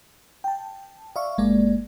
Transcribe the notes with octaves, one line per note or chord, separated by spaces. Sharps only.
G5 A5
D5 E5 F5 C#6
G1 G#3 A#3 D5